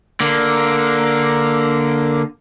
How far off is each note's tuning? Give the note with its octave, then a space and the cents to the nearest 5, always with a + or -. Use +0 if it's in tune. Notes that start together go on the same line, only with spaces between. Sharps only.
D3 +0 A#3 +0